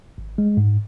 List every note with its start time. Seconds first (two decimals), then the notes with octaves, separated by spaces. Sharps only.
0.18 G#1
0.38 G#3
0.57 G#2